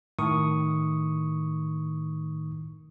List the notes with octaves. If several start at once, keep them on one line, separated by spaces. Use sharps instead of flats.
A2 D#3 C#6 D#6